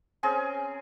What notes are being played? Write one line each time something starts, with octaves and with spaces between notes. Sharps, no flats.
C4 C#4 G#4 A#4